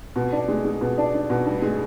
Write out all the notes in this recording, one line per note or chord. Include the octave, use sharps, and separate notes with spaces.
B2
D4
G#3
G#3
B2
D4
D4
B2
G2
G#3